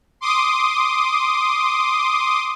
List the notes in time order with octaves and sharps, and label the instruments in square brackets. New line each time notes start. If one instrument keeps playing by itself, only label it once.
[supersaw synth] C6 D6 D#6